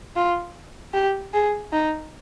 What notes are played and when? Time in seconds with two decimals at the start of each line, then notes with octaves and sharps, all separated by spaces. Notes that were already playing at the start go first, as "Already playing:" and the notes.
0.16 F4
0.94 G4
1.34 G#4
1.73 D#4